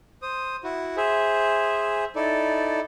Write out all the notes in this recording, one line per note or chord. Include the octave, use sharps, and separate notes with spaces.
C5 D#6
E4 F#4
G#4 C5 E5
D#4 E4 A4 D5